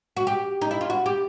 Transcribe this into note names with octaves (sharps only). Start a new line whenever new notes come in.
F#4
G4
D#4
E4
F4
F#4
G4